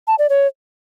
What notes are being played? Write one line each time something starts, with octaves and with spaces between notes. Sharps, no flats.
A5
D5
C#5